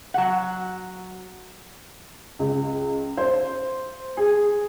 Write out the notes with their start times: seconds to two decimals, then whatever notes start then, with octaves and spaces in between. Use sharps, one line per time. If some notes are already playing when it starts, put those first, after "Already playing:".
0.14 F#3 F#5
2.39 C#2
3.17 C5
4.17 G#4